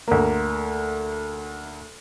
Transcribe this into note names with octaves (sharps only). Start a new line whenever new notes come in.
D2 A#3